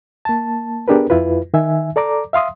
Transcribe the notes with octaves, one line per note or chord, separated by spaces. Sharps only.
A#3 A5
B3 D4 G4 G#4 A#4 B4
F2 E4 F4 B4
D#3 E5 G#5
A4 D5 A#5 D6
E5 F5 C6 D#6